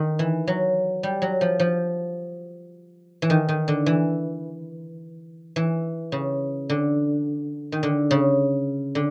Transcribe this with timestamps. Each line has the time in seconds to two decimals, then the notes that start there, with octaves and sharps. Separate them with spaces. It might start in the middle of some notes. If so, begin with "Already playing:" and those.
Already playing: D#3
0.19 E3
0.47 F#3
1.03 G3
1.22 F#3
1.41 F3
1.59 F3
3.22 E3
3.30 D#3
3.49 D#3
3.68 D3
3.86 E3
5.56 E3
6.12 C#3
6.69 D3
7.72 D#3
7.83 D3
8.11 C#3
8.95 D3